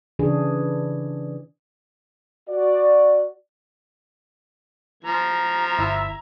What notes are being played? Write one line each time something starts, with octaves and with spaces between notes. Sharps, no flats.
C#3 E3 D4 G#4
F#4 D5
F3 A#5 G#6
G1 E4 E5 E6